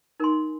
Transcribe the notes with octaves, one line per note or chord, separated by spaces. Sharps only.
D#4 A#4 G#5 C6